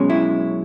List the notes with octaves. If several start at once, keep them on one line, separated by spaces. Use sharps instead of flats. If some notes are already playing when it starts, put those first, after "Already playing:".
Already playing: B1 B2 G#3 C#4
E4